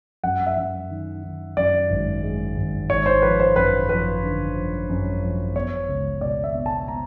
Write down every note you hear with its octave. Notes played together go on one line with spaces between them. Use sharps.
F#2 F#5
E5
F#2
D#3
D#3
F#2 D5
G#1
G#3
G#1
G#1 C#5
C5
F3 B4
C5
F#2 B4
F3 B4
D3
F3
F#2
F3
B3 C#5
C#2
B2 D5
E5
B3
A5
B3 A#5